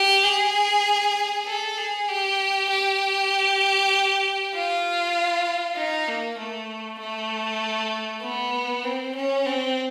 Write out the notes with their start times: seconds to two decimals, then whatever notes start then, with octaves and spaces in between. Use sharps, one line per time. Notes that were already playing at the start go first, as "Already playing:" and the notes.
Already playing: G4
0.24 G#4
1.47 A4
1.78 G#4
2.08 G4
2.70 G4
4.54 F4
5.77 D#4
6.08 A#3
6.39 A3
7.00 A3
8.23 B3
8.84 C4
9.15 C#4
9.46 C4